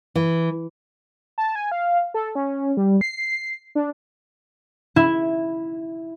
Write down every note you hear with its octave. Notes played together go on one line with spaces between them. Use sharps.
E3
A5
G#5
F5
A4
C#4
G3
C7
D4
E4